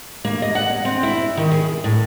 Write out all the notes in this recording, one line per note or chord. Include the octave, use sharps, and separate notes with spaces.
A#3
D#5
F#5
C4
E4
D#3
G#4
A2